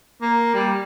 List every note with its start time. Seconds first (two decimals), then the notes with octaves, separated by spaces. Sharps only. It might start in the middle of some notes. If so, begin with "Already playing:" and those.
0.22 A#3
0.54 G3